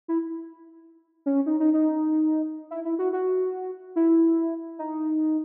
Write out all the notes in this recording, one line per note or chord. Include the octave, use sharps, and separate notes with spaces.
E4
C#4
D#4
D#4
D#4
E4
E4
F#4
F#4
E4
D#4